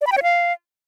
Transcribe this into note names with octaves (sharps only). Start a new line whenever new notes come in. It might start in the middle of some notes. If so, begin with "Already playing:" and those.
D5
B5
G5
C#5
F5